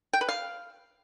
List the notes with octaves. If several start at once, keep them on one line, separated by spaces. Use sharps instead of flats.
G5
B4
F5